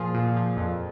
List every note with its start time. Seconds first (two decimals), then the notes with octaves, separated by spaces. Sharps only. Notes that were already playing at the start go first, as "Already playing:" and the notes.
Already playing: A#2 F3 F4 G#4
0.15 A#2
0.36 F3
0.57 F2